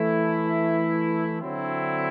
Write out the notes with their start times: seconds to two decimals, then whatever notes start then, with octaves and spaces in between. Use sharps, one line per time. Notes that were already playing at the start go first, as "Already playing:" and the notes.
Already playing: E3 A3 E4
1.40 D3 F#3 C4 E4